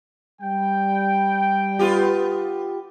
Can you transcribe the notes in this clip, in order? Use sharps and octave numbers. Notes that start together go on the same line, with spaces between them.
G3 G5
B3 F4 G4